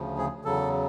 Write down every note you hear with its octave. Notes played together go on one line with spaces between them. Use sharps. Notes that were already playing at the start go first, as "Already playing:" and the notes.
Already playing: D2 C#3 F3
G#4
E2 C#3 F#3 A4